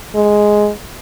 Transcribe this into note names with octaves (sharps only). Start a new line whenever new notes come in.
G#3